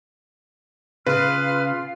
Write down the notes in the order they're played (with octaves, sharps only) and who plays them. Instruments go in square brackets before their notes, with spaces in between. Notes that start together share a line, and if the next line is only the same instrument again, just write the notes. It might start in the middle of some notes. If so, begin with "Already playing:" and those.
[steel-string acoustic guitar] C#3 [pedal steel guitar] F4 [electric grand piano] B4 [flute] F6